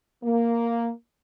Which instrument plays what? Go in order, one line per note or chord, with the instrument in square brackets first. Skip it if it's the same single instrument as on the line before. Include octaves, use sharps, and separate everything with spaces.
[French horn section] A#3